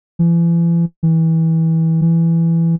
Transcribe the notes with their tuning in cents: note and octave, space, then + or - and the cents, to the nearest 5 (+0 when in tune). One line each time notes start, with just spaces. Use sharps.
E3 +40
E3 -25
E3 +10